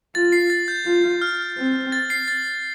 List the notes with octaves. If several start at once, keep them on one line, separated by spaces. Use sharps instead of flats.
F4 A6
C7
A6
G6
F4
F6
C4
A6
C7
A6